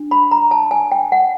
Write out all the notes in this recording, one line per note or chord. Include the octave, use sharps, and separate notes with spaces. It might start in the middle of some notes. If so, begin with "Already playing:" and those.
Already playing: D4
B5
A#5
A5
G#5
G5
F#5